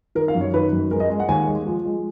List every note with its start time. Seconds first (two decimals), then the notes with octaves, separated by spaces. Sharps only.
0.15 D#3 A#4
0.28 F5
0.35 F#2
0.41 C#5
0.53 D#3 B4
0.72 F#2
0.91 G#3 A#4
1.00 D#5
1.10 G#3
1.20 F#5
1.28 D#2 G#5
1.47 G#3
1.67 F3
1.85 G#3